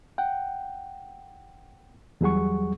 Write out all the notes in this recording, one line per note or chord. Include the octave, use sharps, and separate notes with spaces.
F#5 G5
E2 F#3 G3 G#4 F#5 C#6